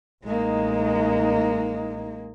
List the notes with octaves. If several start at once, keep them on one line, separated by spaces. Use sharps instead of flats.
A1 G#3 A#3 D#4